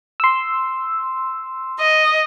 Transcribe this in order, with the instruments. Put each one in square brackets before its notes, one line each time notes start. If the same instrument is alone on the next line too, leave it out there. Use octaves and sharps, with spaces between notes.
[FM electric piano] C6 E6
[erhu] D#5